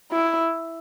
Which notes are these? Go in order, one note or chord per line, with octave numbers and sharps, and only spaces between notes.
E4